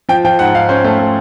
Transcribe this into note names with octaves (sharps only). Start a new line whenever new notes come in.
F3 G5
F3 G5
G#2 F#5
G#2 F5
C#4 C5
A3
A3